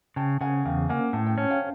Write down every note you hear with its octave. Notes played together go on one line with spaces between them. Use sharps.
C#3 G5 A5
C#3 F#5 G#5
E2 F5 G5
A#3 F#5 G#5
A2 G5 A5
G5 A5
C#4 G5 A5
F5 G5